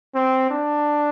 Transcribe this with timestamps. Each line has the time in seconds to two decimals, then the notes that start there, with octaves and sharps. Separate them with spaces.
0.15 C4
0.51 D4